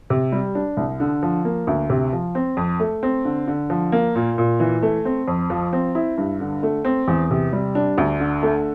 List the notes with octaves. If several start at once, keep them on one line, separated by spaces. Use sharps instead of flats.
C3
G3
D4
C2
D3
F3
A#3
D2
C3
F3
C4
F2
A3
C4
D3
D3
F3
A#3
A#2
A#2
E3
A3
C4
F2
F3
C4
E4
G2
D3
A3
C4
E2
C3
G3
D4
D2
D3
A3